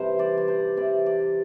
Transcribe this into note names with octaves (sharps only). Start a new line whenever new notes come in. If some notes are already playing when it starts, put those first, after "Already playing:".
Already playing: C3 E3 G3 C5
D5
D5
C5
C3 E3 G3 D5
D5